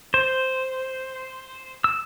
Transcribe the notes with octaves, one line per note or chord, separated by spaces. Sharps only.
C5
E6